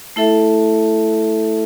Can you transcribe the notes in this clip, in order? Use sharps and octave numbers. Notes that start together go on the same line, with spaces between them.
A3 E4 A4 E5